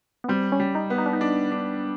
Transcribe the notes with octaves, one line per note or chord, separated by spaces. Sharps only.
B3
G3 C4
C#4
G3
D#4
B3
D#4
D4
D#4
D4
D4